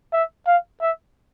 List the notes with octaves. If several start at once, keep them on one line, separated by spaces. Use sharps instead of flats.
E5
F5
E5